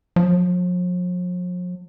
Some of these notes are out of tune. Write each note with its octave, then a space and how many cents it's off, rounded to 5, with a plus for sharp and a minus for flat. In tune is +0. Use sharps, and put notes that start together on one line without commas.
F3 +45